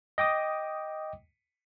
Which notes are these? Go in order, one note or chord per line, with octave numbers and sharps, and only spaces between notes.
D#5 G5 D6 D#6